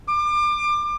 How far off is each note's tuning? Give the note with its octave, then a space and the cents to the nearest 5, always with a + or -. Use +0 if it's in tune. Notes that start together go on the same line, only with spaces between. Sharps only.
D6 +30